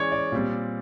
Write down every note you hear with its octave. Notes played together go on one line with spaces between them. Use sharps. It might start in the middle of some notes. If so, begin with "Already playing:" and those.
Already playing: E3 G#3 C#4 C#5 D5
D5
A#2 G3 C4